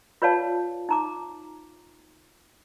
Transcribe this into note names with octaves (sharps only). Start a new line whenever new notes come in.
F4 B4 C#5 D5 F5 A5
D#4 A#5 D6